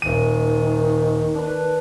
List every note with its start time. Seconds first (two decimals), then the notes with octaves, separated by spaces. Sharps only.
0.02 D#1 D#3 D#7
1.35 D4 B4